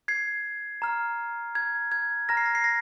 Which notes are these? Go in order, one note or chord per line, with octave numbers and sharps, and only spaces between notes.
G#6 C7
A#5 F6
G#6
G#6
A#5 F6 A#6
C7
A#6
C7
A#6